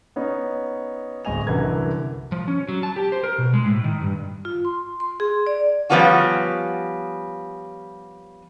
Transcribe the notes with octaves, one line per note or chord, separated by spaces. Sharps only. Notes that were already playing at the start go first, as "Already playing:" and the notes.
B3 C#4 D#4
D1 G#3 D#5 G#5 F7
C2 F#2 D3 E3 A#4 G#6
F3
C#4
F#3
A5
G4
C5
A#4
B2
G#3
A2
D#3
G2
F4
C6
C6
G#4
D5
F3 G3 B3 C#4 F4 F#4